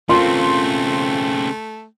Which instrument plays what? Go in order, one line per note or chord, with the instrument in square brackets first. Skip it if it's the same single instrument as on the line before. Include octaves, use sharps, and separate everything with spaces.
[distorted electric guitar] C#3 C4 [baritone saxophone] A3 [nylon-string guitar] F4 A#4 [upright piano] C6